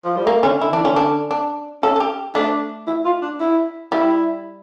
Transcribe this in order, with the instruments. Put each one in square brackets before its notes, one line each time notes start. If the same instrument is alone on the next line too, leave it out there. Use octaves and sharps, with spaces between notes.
[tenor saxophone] F3
G3
[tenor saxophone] A3 [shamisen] A#3
[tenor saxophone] D3 [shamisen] C#4
[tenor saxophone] D3 [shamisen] E4
[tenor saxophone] E3 [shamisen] D4
[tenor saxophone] D3 [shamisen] C#4
[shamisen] D4
D4
[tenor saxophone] C#4 [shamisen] A4
[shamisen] A4
G4
[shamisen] A3 [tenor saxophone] D4
[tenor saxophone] E4
F4
D4
E4
[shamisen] G3 [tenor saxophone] E4